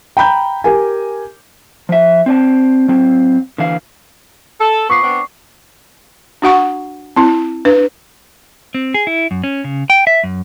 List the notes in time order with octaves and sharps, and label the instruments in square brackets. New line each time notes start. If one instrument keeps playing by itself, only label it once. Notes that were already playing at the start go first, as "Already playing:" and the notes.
[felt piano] G5 A#5 B5 G6
G4 A#4 G#5
[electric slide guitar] F3 E5
C4 D5 A5
F#3 C4
D3 E3 F5
[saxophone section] A4
[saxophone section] F3 B3 [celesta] C#6 D6 C7
[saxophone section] B3 C4 D4
[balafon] D4 F#4 F#5 C#6
C4 E4
D4 B4
[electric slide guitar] C4
G#4
E4
F#2
C#4
C#3
G5
E5
F#2